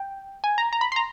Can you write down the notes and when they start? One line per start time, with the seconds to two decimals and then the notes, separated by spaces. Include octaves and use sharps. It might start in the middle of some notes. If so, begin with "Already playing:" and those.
Already playing: G5
0.44 G#5
0.58 A#5
0.73 A#5
0.81 B5
0.92 C6
0.96 A#5